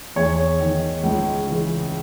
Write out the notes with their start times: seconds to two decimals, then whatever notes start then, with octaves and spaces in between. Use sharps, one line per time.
0.16 E2 C#5
0.60 D#3
1.03 C#2
1.47 C#3 E3